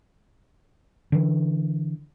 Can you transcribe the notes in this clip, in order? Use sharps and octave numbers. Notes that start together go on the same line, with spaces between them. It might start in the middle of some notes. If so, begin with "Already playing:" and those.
D3 E3